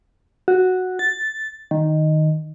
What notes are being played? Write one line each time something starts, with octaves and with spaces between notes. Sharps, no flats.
F#4
A6
D#3